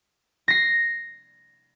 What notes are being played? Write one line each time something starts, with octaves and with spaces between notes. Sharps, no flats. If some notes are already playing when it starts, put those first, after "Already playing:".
A#6 C7